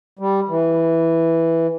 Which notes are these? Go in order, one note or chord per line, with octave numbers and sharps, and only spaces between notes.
G3
E3